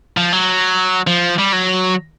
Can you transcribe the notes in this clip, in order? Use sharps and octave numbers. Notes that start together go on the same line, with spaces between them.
F3
F#3
F3
G3
F#3